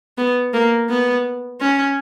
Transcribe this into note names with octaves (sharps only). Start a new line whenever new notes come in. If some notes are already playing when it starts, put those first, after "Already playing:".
B3
A#3
B3
C#4